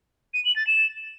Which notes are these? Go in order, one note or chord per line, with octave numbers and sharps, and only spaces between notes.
D#7
F#7
A6
E7